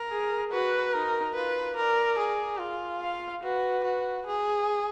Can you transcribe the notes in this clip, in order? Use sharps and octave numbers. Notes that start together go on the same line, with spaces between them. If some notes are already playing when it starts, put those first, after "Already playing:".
Already playing: A#4
G#4
F#4 B4
D#4 A#4
F4 B4
A#4 D5
G#4
F4
F5
F#4 B4
F#4
G#4